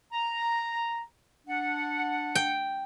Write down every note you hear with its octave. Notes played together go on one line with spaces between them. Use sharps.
A#5
D4 F#5
G5